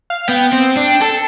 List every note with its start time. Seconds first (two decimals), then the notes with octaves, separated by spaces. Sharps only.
0.10 F5
0.28 B3 G5
0.53 C4
0.77 D4
1.01 A4 A5